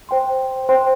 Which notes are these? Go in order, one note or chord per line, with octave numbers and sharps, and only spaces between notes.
C5 G5 C6
C5 G5 C6